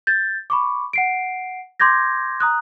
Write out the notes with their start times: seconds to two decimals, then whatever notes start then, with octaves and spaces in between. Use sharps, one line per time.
0.07 G6 A6
0.50 B5 C#6 D6
0.93 F#5 C7 D7
1.80 C6 D6 G6 G#6 A#6
2.40 A#5 D#6 F#6